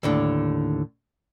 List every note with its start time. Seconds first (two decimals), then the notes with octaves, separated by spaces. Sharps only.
0.03 D#2 A2 D3